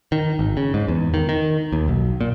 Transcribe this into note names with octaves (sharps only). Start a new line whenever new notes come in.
D#3
G#1
C#3
G#2
E2
D#3
D#3
D#2
B1
A#2